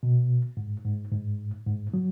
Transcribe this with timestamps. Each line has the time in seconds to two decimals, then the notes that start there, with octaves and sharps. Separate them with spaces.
0.03 B2
0.57 G#2
0.85 G#2
1.12 G#2
1.67 G#2
1.94 F#3